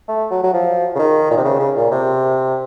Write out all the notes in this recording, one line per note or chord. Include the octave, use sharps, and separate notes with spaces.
A3
F#3
F#3
F3
C#3
D#3
A#2
C3
C#3
C#3
A#2
C3